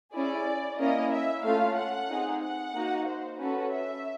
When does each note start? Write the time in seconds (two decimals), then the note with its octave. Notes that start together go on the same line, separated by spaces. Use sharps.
0.14 C#4 E4 G#4 D5
0.79 A#3 C#4 E4 D#5
1.12 E5
1.44 A3 C#4 F4 F5
1.77 F#5
2.09 C4 D#4 G#4
2.42 F#5
2.74 A#3 D#4 F#4
3.07 C5
3.39 C#4 F#4 A4 B4
3.72 E5